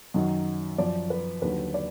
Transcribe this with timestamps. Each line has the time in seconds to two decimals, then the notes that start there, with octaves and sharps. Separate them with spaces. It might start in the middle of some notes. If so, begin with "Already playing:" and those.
0.14 F#2 D#3 F#3
0.78 F#2 F3 D5
1.10 B4
1.42 D#2 D3 F#3 B4
1.74 D5